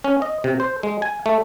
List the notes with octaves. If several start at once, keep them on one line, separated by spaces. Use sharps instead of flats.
C#4
D#5
C3
C5
G#3
G#5
A3